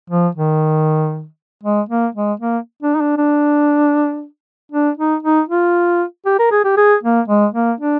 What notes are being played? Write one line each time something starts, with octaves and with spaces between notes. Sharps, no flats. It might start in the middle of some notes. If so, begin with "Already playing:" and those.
F3
D#3
G#3
A#3
G#3
A#3
D4
D#4
D4
D4
D4
D#4
D#4
F4
G4
A#4
G#4
G4
G#4
A#3
G#3
A#3
D4